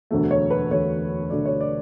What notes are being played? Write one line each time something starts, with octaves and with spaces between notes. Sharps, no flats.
E1 D2 D3 F#3 A3
C#5
B4
E1 D2 D3 F#3 A3 C#5
E1 D2 D3 F#3 A3 D5
C#5
D5